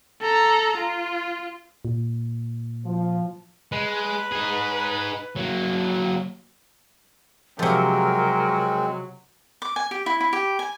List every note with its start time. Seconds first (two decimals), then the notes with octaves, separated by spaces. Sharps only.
0.21 A4 A#5
0.77 F4
1.85 A#2
2.86 F3
3.72 G#3 B4
4.32 D#4 G#4
5.36 F#3 A#3
7.59 C3 F3 F#3 G#3 C4 A#4
9.62 D6
9.76 G#5
9.91 G4
10.06 E4
10.20 E4
10.33 G4
10.59 G#5